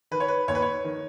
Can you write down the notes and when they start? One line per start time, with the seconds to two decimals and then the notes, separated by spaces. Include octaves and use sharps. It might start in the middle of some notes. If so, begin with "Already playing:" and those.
0.11 D#3 B4
0.20 C#5
0.28 B4
0.48 D#2 C#5
0.55 B4
0.62 C#5
0.84 D#3